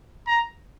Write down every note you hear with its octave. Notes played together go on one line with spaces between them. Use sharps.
A#5